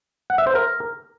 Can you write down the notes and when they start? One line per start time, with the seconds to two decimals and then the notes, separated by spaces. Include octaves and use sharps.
0.30 F#5
0.38 E5
0.47 C5
0.55 A#4